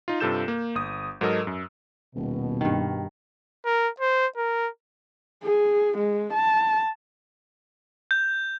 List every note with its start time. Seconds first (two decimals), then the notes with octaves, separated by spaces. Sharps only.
0.08 D#4 F4
0.20 G2 C3 F4 A4 G6 E7
0.48 A#3
0.75 G1 D#6
1.21 G#2 F#3 A4 A#4 D#5 E6
1.47 F#2
2.15 D#1 B2
2.61 G2 D#3
3.65 A#4
4.00 C5
4.37 A#4
5.43 G#4
5.98 G#3
6.34 A5
8.11 G6